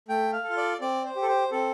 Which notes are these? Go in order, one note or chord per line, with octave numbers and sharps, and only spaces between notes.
A3 G5
F5
A4
F4
D5
C4 D5
C5
G4
A4
C5
C4 A4